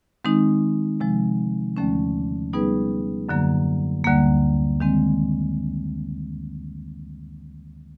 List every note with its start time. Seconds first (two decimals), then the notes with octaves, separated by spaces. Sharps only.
0.25 D#3 G#3 C4 D#4
1.00 C3 F3 G#3
1.77 D#2 D3 F3 A3 C#4
2.53 G3 B3 D#4 G#4 B4
3.29 F#2 D3 F#3 A#3
4.04 D2 D3 G3 A#3
4.80 D#3 G#3 C4